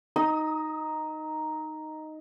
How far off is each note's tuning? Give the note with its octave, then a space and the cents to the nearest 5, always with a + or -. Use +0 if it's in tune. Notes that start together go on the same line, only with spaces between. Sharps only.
D#4 +0 D#6 +35